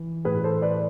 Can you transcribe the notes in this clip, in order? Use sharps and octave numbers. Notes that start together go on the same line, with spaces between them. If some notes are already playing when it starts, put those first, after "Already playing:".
Already playing: E3
A2 E3 G#4 B4
A4 C5
B4 D5